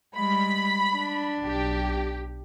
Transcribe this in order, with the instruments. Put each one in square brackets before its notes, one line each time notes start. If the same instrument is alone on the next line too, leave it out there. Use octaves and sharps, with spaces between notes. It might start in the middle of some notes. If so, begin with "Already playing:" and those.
[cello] G3 G#3 [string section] B5
[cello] D4
[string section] B1 G4